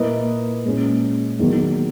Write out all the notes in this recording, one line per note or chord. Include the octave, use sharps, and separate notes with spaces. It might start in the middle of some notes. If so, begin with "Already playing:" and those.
Already playing: A#2 A#3 E4 B4 D#5
A#2 G#3 C#4
E2 D#3 F#3 A#3 D#4